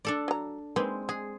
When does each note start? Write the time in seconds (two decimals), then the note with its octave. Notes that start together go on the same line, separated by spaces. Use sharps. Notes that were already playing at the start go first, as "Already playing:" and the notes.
0.05 D4 A4 D5
0.28 F#3 A#5
0.76 G#3 A#3 C4 D#4 B4
1.09 G#3 G#4